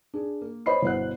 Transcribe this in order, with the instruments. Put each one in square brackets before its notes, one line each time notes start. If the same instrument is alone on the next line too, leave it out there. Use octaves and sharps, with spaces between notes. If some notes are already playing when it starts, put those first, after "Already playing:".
[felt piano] D4 G#4
A#3
C5 C#5 D#5 B5 C6 C7
G1 B2 E4 C5 F#5 F#6